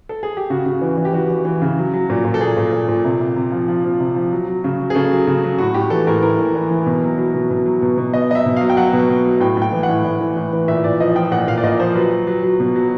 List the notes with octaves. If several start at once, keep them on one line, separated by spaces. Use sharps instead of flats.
A4
G#4
G4
C#3 F#4
C#3
E3
E3
G4
E3 F#4
E3
E3
C#3
F#3
F#3
A#2
A#2
A4
A#2 G#4
A#2
A#2
A#2
C3
C3
C3
F3
F3
F3
C3
F3
F#3
F#3
C#3
F#3
G#4
C#3 A4
F#3
C#3
F#3
A2 F#4
A2 G4
E3 A4
A2 A#4
A2 A#4
E3
E3
E3
B2
F#3
F#3
B2
B2
F#3
B2
B2
B2 D#5
F#3 D#5
E5
B2
F#3 F5
G5
F#3 F#5
B2
B2
F#3
A2 G5
A2 G5
E3
F#5
A2
A2
E3
A2
E3
A#2 E5
A#2 D5
F3 D#5
F3 G5
A#2 F#5
A#2 F5
D5
A#2 D#5
F3 C5
F#3 B4
F#3
F#3
F#3
B2
F#3